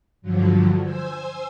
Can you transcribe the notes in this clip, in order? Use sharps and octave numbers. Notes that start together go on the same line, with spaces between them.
G2 D3 F3 F#3
C5 G#5 E6